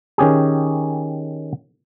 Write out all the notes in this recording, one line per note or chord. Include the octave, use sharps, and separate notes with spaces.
D#3 C#4 G4 G#4